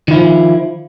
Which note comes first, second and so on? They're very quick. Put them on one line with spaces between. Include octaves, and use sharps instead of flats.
D#3 E4 F3